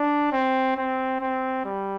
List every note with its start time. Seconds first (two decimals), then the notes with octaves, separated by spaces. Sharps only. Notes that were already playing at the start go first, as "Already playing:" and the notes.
Already playing: D4
0.32 C4
0.77 C4
1.21 C4
1.65 G3